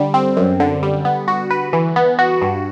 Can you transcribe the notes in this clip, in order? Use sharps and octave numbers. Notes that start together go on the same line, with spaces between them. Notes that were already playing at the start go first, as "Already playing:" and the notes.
Already playing: D3 G3
C4
F#2
D3
G3
B3
F#4
B4
E3
B3
F#4
G2